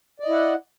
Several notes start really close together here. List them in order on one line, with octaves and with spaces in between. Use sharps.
D5 D#5 E4 F#5